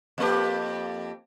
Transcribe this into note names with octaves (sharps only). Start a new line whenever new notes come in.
F2 A#3 G4